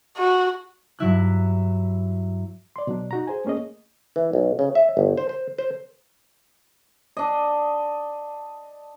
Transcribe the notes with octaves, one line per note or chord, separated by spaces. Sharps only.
F#4
G2 F#3 E4 F#6
D5 C6
B2 F#3 D4
D#4 F#4 A#5
G#4 C5 G#5
A3 A#3 C#4 G#4 D#5
E3
B1
C#3
E5
G1
C5
C5
C5
D4 D#5